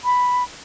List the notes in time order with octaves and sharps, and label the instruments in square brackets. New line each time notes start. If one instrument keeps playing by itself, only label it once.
[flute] B5